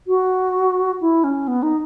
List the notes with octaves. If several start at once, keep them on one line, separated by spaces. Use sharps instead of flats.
F#4
E4
C#4
B3
D#4